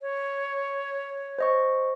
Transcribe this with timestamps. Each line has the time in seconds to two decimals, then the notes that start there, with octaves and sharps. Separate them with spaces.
0.01 C#5
1.39 C5 D#5 C#6